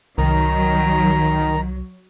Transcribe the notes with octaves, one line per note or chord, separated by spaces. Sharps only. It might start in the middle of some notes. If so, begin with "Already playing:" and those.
C2 D#3 F#3 A#5